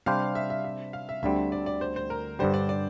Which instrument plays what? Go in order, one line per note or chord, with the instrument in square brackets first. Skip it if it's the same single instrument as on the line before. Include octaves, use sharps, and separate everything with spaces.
[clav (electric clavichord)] C3 G3 D4 G4 C5 [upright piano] F5
[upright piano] E5
E5
E5
F5
E5
[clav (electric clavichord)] D2 D3 G3 C4 [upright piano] E5
[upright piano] D5
D5
C5
C5
A#4
[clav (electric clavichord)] G2 D3 G3 [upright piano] C5
[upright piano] D5
D5